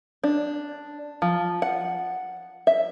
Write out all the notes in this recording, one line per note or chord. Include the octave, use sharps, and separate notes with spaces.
D4
F3
F#5
E5